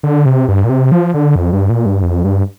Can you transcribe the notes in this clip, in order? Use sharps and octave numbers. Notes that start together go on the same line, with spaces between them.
D3
C3
G2
A#2
C3
F3
D3
F2
G2
A#2
G2
F2
G2